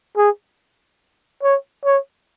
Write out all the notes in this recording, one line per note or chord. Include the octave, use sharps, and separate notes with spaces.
G#4
C#5
C#5